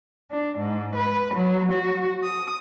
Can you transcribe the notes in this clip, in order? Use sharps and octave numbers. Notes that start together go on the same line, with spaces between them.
D4
G#2
B4
F#3
F#4
D#6